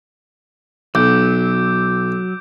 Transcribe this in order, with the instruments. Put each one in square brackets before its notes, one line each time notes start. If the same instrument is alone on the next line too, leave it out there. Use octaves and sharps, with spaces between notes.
[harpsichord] B1 [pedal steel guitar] F#3 [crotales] D6 G6 D7